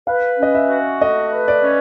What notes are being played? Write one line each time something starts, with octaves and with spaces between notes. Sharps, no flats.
B4 F5
C#4 D#5
E5
F#4
A3 D#5
B4
D5
C#4